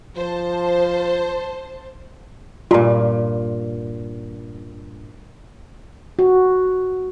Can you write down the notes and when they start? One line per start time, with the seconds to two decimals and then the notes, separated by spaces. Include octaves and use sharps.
0.16 F3 C5 A5
2.71 G2 A#2 F4 A#5
6.19 F#4